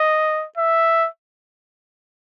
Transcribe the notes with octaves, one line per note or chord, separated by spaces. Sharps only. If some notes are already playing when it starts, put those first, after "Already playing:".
Already playing: D#5
E5